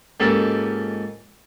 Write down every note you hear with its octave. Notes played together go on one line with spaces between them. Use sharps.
C#2 G#2 A#3 G4 A4